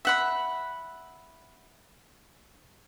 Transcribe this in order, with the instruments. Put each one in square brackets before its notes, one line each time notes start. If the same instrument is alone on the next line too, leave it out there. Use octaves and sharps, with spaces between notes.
[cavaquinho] E5 F#5 B5